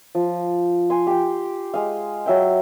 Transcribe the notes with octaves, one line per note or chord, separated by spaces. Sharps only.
F3
G#5 C6
G4 G5
G#3 F5
F#3 E5 G5